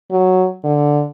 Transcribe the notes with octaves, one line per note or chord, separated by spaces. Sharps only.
F#3
D3